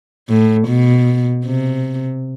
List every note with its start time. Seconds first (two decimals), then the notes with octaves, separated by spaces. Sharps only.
0.29 A2
0.68 B2
1.46 C3